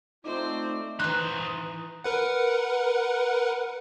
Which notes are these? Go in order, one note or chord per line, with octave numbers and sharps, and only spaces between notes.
A3 C4 D#4 F4 A4 C5 D5
D#3 E3 D#4 C5 F#6
A#4 B4 F#5